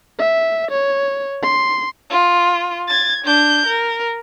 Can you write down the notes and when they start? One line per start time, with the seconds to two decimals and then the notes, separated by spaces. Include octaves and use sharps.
0.19 E5
0.71 C#5
1.43 C6
2.10 F4
2.88 G#6 A6
3.25 D4 G6
3.67 A#4